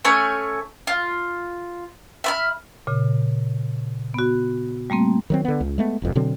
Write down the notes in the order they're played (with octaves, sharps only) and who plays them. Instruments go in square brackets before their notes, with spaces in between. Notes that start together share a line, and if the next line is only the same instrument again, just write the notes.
[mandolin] A3 C#4 C#5 G#5
F4
E5 B5 F6
[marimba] A#2 C#3
B3 F#4
G3 A3 A#3 C4
[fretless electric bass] D#3 F#3 C4
D3 B3
C#2
G#3 A3 B3
E1 C2 F2 B2
B2 D3 F#3 C4